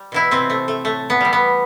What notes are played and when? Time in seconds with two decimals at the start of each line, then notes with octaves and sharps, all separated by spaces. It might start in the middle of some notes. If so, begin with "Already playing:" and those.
Already playing: G3
0.12 B2 E3 E4
0.31 C3 C4
0.50 A3
0.68 A3
0.85 A2 A3
1.10 B3
1.20 E3 G3
1.33 B3